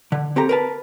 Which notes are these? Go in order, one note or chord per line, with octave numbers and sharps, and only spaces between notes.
D3
C4 G4 A4 A#5
A#4 B4 A5